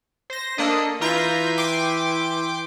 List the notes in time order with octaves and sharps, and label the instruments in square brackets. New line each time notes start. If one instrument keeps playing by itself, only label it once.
[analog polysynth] C5 A#6
[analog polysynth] A#3 A4 D#5 [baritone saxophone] D4
[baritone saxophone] E3 [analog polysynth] F4 A#5 G6
[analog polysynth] G5 C6 D6